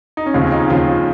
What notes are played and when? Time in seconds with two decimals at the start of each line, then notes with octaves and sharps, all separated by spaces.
0.17 D#4
0.26 C#4
0.34 D#2 C#3 F3 C4
0.52 D#4
0.70 D#2 C#3 F3 F4